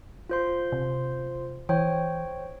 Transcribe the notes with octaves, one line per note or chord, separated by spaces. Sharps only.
F4 C5 C6
C3
E3 C5 C#5 G5